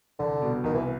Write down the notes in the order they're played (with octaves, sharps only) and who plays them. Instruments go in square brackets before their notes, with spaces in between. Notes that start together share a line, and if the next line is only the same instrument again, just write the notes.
[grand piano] C2 [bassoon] D3
[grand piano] B2 G3 B3
[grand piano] C2 [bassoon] D#3
[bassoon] E3